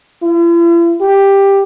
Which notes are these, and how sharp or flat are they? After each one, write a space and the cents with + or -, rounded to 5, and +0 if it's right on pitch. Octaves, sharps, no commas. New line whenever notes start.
E4 +45
G4 +10